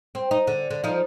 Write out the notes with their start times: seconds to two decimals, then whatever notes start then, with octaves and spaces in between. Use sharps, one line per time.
0.15 C4
0.31 D#4
0.47 D3
0.70 D3
0.84 F3 D#4